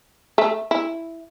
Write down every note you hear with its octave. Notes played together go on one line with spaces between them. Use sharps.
A3
E4